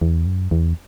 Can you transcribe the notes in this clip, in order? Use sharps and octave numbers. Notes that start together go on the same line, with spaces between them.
E2
F#2
E2